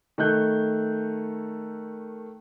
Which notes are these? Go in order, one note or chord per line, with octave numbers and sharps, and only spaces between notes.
D#3 A3 F#6 G6